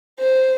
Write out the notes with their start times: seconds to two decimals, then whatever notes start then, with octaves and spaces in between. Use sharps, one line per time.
0.19 C5